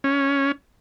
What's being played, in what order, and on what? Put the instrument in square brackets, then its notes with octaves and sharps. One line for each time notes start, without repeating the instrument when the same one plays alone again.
[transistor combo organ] C#4